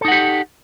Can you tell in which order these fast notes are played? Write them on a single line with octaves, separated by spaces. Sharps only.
A4 D#4 F#5 G4